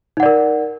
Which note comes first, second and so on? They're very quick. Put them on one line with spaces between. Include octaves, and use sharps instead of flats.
D#4 F#5 D5 A#4